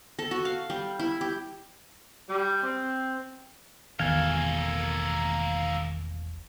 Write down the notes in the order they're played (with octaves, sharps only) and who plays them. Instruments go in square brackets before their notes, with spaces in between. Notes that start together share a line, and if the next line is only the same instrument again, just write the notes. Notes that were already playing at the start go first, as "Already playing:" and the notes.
[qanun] A4
F#4
F5
G3
E4
G4
[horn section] G3
C4
[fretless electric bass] E1 A1 B2 [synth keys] D#3 [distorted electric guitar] A#3 A4 [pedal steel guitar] F5 G#5